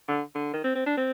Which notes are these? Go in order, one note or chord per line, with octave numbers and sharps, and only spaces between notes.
D3
D3
D#3
C4
C4
D4
C4